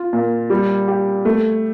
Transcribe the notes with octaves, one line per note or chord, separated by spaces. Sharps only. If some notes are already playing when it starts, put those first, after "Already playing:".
Already playing: F4
A#2
G3
G4
A3